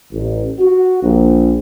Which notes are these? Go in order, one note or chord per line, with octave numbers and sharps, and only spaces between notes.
A1
F#4
A#1